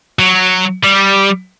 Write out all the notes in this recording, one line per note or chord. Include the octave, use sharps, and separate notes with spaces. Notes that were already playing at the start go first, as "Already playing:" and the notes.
F#3
G3